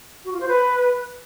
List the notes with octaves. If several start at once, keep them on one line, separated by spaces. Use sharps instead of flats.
F#4
F4
C5
B4